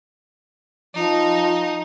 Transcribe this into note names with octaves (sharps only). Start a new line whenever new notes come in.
F3 D#4